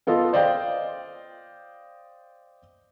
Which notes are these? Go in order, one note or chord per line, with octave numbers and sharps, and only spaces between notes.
B3 F4 A4 D#5
C5 D5 D#5 F5 G5